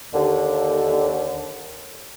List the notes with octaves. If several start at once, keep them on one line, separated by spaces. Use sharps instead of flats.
D#2 D3